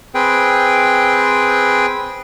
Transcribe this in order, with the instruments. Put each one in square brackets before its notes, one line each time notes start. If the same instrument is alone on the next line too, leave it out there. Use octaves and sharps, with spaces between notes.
[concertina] C4 G#4 B4 G5